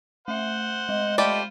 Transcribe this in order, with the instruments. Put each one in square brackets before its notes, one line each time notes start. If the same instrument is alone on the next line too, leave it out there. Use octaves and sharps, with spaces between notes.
[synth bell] A3 E5 [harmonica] C5 F#5
[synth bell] G#3 [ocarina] D#5
[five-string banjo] A3 G4 D5 [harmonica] F4 C5 B5